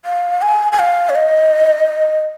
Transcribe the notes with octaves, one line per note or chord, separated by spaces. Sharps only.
F5
G#5
G#5
F5
C#5
D#5